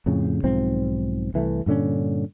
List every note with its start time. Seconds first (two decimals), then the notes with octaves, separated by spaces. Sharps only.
0.06 F2 A2 C#3
0.44 B1 G#2 F3 C4
1.34 C2 E3 G#3 A3
1.66 G2 A#2 D3 C#4